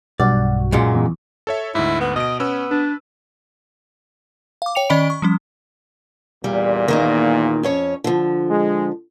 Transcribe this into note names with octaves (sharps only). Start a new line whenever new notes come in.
B1 G2 F#4 D5
F#2 A#2 G#3
E2
A4 C#5 E5
D2 G#2 E4
B3
B2 D#5 D7
B3 C#4 E6
D4 B4
F5 D6
C#5 G5 C#7 F7
D#3 C#4 D5 D#5 B5 D7
C#6
F3 G3 C#4
E2 A#2 G3
D#3 A#3 D#4
F2 C#4 C#5
D3 F3
G#3